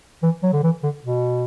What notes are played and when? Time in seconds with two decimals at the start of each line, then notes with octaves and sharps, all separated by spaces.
0.23 E3
0.43 F#3
0.53 D3
0.63 E3
0.83 D3
1.04 B2